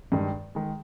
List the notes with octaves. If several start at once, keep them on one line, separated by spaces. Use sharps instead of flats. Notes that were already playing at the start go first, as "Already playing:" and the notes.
G2 D#3 G#3
D#3 G#3